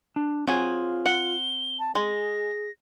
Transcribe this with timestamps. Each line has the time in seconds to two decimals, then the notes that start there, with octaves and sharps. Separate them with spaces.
0.16 D4
0.47 F#3 C4 F4 G#4 G#5
1.06 F#5 G7
1.79 A5
1.95 G#3 G#4 A#6